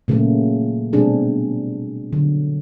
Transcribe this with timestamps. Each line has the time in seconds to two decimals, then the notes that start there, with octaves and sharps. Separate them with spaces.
0.08 A#2 C#3 F#3 A3 A#3
0.93 B2 G3 A3 C4 D4 G#4
2.13 D3 F#3